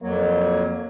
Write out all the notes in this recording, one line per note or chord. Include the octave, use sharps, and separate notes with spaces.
F2 F#3 A#3